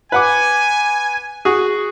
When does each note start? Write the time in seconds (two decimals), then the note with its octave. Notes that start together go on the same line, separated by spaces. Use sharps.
0.12 B4 F#5 G#5 D6
1.45 F#4 G#4